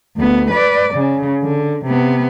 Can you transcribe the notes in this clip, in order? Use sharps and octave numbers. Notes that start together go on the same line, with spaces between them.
D2 B3
B4 D5
C#3
D3
C3 B3